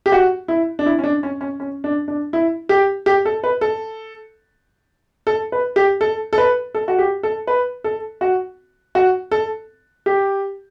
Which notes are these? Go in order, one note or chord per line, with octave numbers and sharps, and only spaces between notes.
G4
F#4
E4
D4
E4
C#4
D4
C#4
C#4
C#4
D4
D4
E4
G4
G4
A4
B4
A4
A4
B4
G4
A4
A4
B4
A4
F#4
G4
A4
B4
A4
F#4
F#4
A4
G4